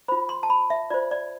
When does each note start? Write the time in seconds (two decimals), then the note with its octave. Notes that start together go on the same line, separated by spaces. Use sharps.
0.08 F4 C5 B5
0.29 C6
0.43 A5
0.50 B5
0.70 E5
0.90 F4 C5 D5
1.11 D5